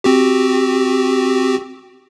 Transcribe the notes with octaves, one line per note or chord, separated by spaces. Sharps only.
C4 F#4 G4